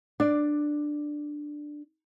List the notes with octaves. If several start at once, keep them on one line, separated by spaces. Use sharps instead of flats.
D4 D5